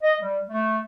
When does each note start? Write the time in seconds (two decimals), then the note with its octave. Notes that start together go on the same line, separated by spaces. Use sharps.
0.03 D#5
0.21 G3
0.49 A3